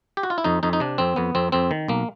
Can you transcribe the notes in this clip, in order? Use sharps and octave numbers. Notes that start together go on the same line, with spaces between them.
G4
F#4
F4
E4
F2 D#4
F2 D#4
D#4
C3 D4
F2 C4
F2 B3
F2 C4
F2 C4
D#3
B1 A#3